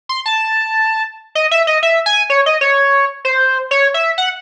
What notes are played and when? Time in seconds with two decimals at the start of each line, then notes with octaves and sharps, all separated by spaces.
0.09 C6
0.26 A5
1.35 D#5
1.51 E5
1.67 D#5
1.83 E5
2.06 G#5
2.30 C#5
2.46 D#5
2.61 C#5
3.25 C5
3.71 C#5
3.94 E5
4.18 F#5